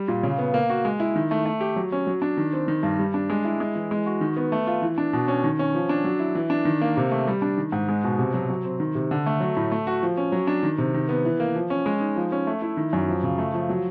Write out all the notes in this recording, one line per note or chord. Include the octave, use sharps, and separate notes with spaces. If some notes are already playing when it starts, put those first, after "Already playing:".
Already playing: G3
A#2
C#3
B3
A#3
F#4
G#3
E4
D#3
A3
A3
G4
F#3
C#4
F#3
D4
D#3
C4
D#3
G2
G3
D4
G#3
E4
G#3
E3
G#3
F#4
D#3
B3
A3
F4
E3
D4
B2
C#4
D#3
C#4
F3
D4
F#3
E4
E3
D4
D#3
A#3
C3
A3
G3
D4
D#3
G#2
G#3
B2
C3
F#3
F#3
C4
D#3
C3
D3
A3
F#3
A2
A3
F#4
F3
C#4
F#3
D4
D#3
C3
D#3
B3
E3
A#3
F3
C#4
G#3
D#4
F3
C#4
A3
E4
D#3
F#2
F3
C#3
A3
F3
F#3